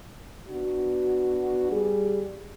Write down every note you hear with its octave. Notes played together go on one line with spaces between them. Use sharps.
B3 D4 F#4
G3 G#4